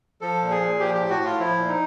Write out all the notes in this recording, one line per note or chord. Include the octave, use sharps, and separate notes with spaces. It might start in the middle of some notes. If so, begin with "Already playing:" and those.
F3 A4
A#2
G#4
A#2
F3 G4
G4
A2
F#4
A2
F4
F3 E4
A#2
D#4